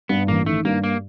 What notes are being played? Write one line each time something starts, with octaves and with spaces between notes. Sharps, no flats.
G2 B3
A1 A#3
D#3 A3
G2 A#3
A#3